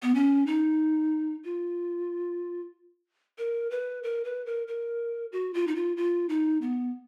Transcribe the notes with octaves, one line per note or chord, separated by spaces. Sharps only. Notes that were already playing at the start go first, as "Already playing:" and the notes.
B3
C#4
D#4
F4
A#4
B4
A#4
B4
A#4
A#4
F#4
F4
D#4
F4
F4
D#4
B3